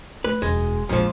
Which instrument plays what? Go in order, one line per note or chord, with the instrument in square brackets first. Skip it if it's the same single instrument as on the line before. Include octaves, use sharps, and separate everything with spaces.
[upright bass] A3 [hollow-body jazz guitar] B4
[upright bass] E1 F#2 [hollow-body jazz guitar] G#3
[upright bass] A#1 G#3 [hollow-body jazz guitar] F2 F3